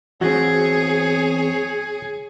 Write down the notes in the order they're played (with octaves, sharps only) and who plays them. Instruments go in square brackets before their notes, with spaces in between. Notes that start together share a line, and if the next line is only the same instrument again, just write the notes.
[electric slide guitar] E2 C4 [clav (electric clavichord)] F#4 [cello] G#4 [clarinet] C#5